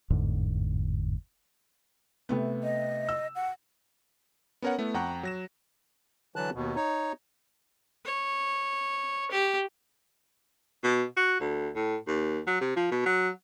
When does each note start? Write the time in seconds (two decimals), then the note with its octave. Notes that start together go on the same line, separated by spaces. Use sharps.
0.10 G1 E2 G#2 D3
2.29 C3 A3 B3
2.63 D#5
3.09 E6
3.35 F#5
4.62 B3 C#4 A#4 C#5 F#5
4.78 A3 B3 E4
4.94 F2 F#5 G5 A#5 C#6 F#6
5.23 F#3 A#6 E7
6.36 D3 E3 F#3 A5 F#6
6.54 D#2 B2
6.76 D#4 C#5
8.05 C#5
9.31 G4
10.84 B2
11.17 F#4
11.40 D2
11.75 A2
12.08 D#2
12.47 F#3
12.61 C3
12.76 F3
12.91 B2
13.06 F#3